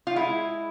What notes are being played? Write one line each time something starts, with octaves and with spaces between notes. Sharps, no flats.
F4
G#3 E4